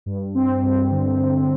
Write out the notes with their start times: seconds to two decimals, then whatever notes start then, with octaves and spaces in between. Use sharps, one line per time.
0.06 G2
0.35 C4
0.63 G2
0.91 D3
1.21 G2